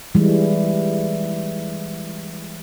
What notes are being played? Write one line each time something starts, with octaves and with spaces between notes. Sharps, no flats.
E3 G3 G#3